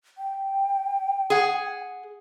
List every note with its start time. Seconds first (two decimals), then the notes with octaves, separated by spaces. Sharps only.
0.18 G5
1.30 G#4 F#5